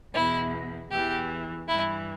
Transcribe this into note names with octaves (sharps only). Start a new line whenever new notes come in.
E2 B2 E4
E2 E3 G4
G2 E3 E4